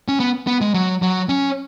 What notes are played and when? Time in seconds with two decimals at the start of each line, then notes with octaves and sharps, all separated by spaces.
0.08 C#4
0.20 B3
0.47 B3
0.61 G#3
0.74 F#3
1.02 F#3
1.29 C#4